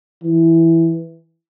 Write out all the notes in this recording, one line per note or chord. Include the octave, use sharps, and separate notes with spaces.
E3